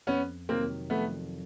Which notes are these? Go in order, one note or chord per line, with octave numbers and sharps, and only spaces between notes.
F2 B3 C#4
C3 D#3 F#3 A#3 C4
F2 A3 B3